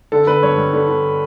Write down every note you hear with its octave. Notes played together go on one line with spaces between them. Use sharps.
D3 A4
D3 B4
G2 C#5
G2
D3
D3